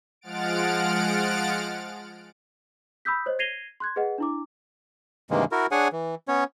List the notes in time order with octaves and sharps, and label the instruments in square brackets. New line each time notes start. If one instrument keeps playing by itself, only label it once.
[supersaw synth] F3 G#3 F#5 F6 A6 D7
[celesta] B5 D#6 E6 G6 B6
C5 C#5 D#5
G#6 A#6 C7 D#7 F7 G7
C6 F#6 G#6
G#4 B4 D#5 F#5
D4 E4 D6
[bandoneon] G2 C3 D#3 E3 G#3 A#3
E4 F#4 A#4
D4 G#4 C#5 F#5 G#5
E3
B3 C#4 C#5